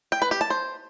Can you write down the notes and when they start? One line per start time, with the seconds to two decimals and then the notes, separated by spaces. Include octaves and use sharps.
0.12 G5
0.22 B4
0.31 G4
0.41 A5
0.50 C5